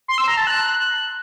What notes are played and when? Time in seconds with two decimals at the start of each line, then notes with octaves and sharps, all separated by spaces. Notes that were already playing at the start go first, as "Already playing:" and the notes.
0.08 C6
0.18 E6
0.28 A#5
0.37 A5
0.47 F#6